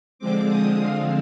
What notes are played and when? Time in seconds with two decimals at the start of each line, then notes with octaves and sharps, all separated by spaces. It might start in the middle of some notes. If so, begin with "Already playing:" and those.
0.19 D3 F3 G#3 C4 D6
0.48 D#6
0.78 F5